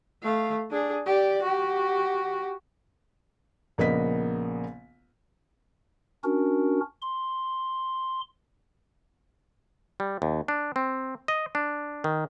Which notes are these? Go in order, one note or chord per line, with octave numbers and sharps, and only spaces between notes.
A3 F5
D4 G#4
G4 D5
F#4 G4
A#1 C#3 A#3 B3 D#5 B6
C#4 D4 F#4 A#4
C6
G3
D#2
D4
C4
D#5
D4
D#3